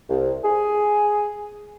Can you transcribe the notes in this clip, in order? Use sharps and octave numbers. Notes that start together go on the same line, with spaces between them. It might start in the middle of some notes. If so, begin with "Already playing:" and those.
C2
G#4